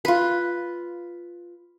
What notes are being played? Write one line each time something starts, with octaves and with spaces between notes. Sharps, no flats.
F4 B4